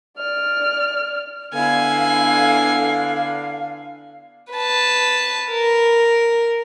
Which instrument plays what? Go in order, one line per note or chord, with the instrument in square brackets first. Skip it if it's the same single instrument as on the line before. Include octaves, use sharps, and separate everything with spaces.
[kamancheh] D5 F6
[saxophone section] D3 [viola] B3 E4 [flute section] F5 [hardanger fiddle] G#5
[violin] B4 A5
A#4